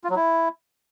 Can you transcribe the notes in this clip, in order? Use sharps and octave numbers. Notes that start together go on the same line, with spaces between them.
F4
F#3
E4